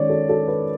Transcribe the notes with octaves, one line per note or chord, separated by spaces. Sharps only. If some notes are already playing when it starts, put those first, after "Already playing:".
Already playing: D#3 G#3 C#4 C#5 D5
A4
A4
B4